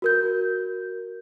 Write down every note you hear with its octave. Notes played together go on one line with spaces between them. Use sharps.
F#4 A#4 G6